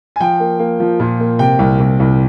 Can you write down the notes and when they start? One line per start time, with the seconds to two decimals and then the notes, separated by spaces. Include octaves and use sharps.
0.16 G#5
0.20 F3 G5
0.40 A#3
0.59 A#3
0.80 F3
0.99 A#2
1.20 A#3
1.39 C3 G5
1.59 C2
1.80 C2
2.00 C2